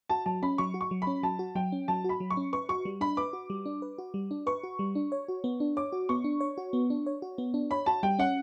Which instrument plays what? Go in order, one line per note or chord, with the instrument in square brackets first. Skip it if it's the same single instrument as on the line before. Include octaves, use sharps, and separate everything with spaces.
[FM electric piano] F#4 [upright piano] A5
[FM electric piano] F#3 [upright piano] A5
[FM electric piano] C#4 [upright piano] B5
[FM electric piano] F#3 [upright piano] C#6
[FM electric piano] F#4
[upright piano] C#6
[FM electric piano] F#3
[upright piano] B5
[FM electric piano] C#4
[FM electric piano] F#3 [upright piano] A5
[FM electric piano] F#4
[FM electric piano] F#3 [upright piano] G5
[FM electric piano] C#4
[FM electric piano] F#3 [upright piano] A5
[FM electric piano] F#4 [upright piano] B5
[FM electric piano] F#3
[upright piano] C#6
[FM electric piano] C#4
[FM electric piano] B4 [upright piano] C#6
[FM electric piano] F#4 [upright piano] C#6
[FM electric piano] G3
[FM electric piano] D4 [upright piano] B5
[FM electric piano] B4 [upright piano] D6
[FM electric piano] F#4
G3
D4
B4
F#4
G3
D4
[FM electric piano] B4 [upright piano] C#6
[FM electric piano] F#4
G3
D4
C#5
F#4
B3
D4
[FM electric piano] C#5 [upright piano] D6
[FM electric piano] F#4
[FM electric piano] B3 [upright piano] C#6
[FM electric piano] D4
C#5
F#4
B3
D4
C#5
F#4
B3
D4
[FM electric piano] C#5 [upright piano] B5
[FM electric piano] F#4 [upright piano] A5
[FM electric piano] G3 [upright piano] G5
[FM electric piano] C#4 [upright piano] F#5